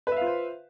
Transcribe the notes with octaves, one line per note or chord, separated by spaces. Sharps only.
F4 B4 C5 E5 F5